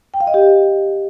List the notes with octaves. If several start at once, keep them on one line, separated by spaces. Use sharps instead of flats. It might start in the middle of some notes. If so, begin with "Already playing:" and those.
G5
F5
D#5
G4